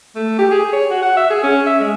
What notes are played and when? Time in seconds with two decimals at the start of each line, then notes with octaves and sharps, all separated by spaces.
0.16 A3
0.39 G4
0.51 G#4
0.73 C#5
0.91 F#4
1.03 F#5
1.17 E5
1.31 G#4
1.43 C#4
1.66 E5
1.80 G#3